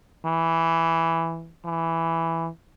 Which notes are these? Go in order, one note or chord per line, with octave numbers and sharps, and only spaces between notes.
E3
E3